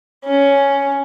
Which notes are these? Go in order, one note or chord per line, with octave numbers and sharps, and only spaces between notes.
C#4